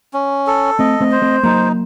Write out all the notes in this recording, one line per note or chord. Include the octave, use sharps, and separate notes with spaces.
C#4
A4
A3 C4 D#5
A3 C4
C5
A3 C4
F#3 A#3 D#4